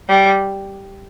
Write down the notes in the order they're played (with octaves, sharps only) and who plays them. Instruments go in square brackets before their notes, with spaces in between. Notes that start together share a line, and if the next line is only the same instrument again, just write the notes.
[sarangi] G3